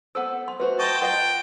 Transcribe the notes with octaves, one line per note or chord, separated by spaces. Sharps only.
B3 A4 C5 E6
C6
A3 F#4 B4 C5
D#5 G5 A5 C6 C#6
F4 B4 D#5 F#5 G5 C6